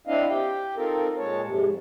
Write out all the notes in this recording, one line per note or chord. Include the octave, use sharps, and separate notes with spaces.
C4 D4 E4 D#5 F5
G4 G5
C4 D#4 F4 A4 A#4
A#2 G#3 C#5 A5
F2 G#2 C3